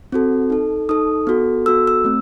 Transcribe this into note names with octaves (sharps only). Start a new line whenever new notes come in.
C4 F#4 A4
D#4 A4
D#4 A4 D#6
B3 F#4 A4
B3 F#4 A4 E6
E6
A3 C4